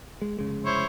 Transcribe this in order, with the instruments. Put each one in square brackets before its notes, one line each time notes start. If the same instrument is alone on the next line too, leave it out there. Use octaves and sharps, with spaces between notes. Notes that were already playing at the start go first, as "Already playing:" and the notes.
[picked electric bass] G#3
F1 C#3 G#3
[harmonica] E4 C5 C#5